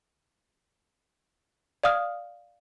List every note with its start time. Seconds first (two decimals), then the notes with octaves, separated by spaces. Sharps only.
1.84 D5 F5 D#6 F6